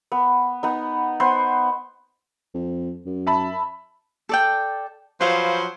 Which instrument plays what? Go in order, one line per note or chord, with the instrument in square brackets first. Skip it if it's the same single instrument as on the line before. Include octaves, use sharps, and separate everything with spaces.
[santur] B3
B3 D#4
B3 C5
[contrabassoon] F2
F#2
[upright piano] E5 A5 B5
[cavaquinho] A4 D5 G5
[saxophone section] F3 F#3 C5 [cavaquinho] B4 F5